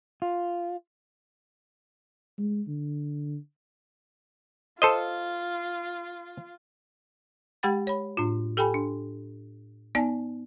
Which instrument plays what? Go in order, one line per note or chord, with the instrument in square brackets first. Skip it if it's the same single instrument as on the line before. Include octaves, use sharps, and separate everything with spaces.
[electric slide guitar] F4
[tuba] G#3
D3
[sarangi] F4 [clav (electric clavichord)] A4 C5 D#5
[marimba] G#3 G4 F#5 G5 B5 A6
C#5 B5
A2 D4 F4
G4 A4 G5 G#5 B5
D4
B3 D#4 D5 G#5 A5